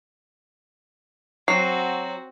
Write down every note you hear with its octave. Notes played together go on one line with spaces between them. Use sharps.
F#3 C4 F#4 C7